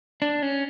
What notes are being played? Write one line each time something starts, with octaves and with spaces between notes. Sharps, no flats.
D4
C#4